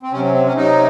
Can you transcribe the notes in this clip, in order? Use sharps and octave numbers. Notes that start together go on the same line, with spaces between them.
C4
C3 F#3 C#4
C4
C4
C#4
C3 F#3 D#4